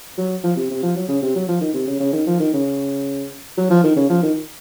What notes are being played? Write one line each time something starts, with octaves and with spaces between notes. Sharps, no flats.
F#3
F3
C3
C3
F3
F#3
C#3
C3
F#3
F3
D#3
C3
C#3
C#3
D#3
F3
D#3
C#3
F#3
F3
D#3
C#3
F3
D#3